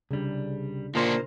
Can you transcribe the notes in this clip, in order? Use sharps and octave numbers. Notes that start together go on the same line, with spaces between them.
C2 C#3 G3 D4
A#2 D3 A#3 D4 D#4 A#4 C5